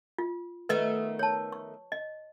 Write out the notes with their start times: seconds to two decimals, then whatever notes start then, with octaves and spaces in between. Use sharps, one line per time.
0.18 F4
0.69 D#3 A3 B3 B4 D#5
1.19 C#5 A5
1.52 C#6
1.92 D#5